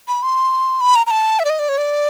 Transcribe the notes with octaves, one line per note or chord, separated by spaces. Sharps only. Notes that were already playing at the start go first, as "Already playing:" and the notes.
B5
C6
B5
A#5
A#5
A5
E5
D5
D#5
D5
C#5
D5